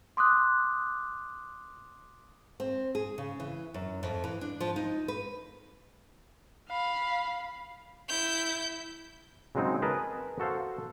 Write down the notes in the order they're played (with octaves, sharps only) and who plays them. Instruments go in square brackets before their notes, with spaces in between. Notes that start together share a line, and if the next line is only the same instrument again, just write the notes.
[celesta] C6 D6 D#6 F#6
[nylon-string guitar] C4
G#4
C#3
E3
F#2
F2
E3
D4
F3
D#4
B4
[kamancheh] F5 B5
[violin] E4 G6
[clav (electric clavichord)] C#3 F#3 G#3 C4 D#4
G#4 A#4 B4 D#5 A5
F#4 A4 C5 F5